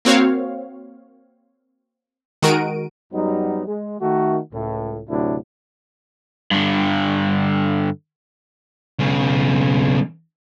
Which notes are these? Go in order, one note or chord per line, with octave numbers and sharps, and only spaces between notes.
A#3 C4 F#4 C#5 F5
D#3 G#3 F#4 A#4 D7 D#7
F#2 F#3 G3 B3 D#4
G#3
D#3 A3 F#4
C#2 A2
D2 A2 C3 F#3 D4 E4
G2 D3
B1 C#3